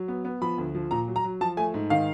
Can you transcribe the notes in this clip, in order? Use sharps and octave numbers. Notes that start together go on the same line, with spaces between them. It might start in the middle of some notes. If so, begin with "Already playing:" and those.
Already playing: F#3
B3
B3
F3 B5
D2
F3
A#2 A#5
F#3
A#5
F#3
F3 A5
A3 G#5
G#2
D#3 F5